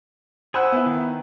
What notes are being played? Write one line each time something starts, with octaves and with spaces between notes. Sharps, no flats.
G#4 C5 F#5 B5 E6
B3 E4
D#3